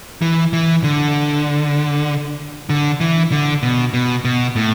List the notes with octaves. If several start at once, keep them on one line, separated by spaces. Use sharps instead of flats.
E3
E3
D3
D3
E3
D3
B2
B2
B2
A2